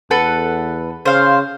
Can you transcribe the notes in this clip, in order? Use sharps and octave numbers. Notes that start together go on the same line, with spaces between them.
E2 A4 B4 F#5
C#3 C5 F5